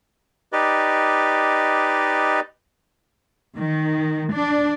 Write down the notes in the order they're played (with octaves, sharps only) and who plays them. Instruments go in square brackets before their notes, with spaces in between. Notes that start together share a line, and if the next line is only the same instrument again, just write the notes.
[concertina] D#4 G4 B4 D5 D#5
[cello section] D#3
D4